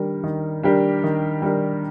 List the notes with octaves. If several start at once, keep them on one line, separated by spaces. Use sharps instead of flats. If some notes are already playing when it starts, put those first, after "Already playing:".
Already playing: D#3 G3 D4 G4 A#4
D#3
G3 D4 G4 A#4
D#3
G3 D4 G4 A#4